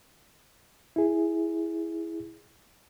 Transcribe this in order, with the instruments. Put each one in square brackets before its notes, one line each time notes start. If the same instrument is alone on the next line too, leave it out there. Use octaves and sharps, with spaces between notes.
[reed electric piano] E4 G#4